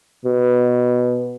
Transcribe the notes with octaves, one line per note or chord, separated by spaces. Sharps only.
B2